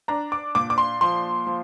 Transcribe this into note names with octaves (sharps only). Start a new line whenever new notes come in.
D4 A#5
D6
A#2 D6
D6
C6
F3 C6
F3